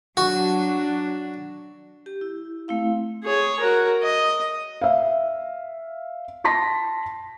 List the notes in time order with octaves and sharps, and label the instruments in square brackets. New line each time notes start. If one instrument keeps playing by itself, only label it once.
[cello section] F#3 D4 [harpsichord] F#4
[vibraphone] G4
E4
A3 C4 E4 F5
[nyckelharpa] G#4 C#5
F#4 A#4
D#5
[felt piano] E5 F5
A5 C6 A#6 B6